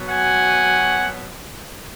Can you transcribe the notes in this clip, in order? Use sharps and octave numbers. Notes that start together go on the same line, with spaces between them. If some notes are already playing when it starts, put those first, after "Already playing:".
Already playing: B2 F#3
F#5 G#5